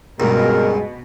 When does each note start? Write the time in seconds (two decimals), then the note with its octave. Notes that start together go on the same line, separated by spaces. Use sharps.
0.20 C#2 G2 B2 G#3 A#4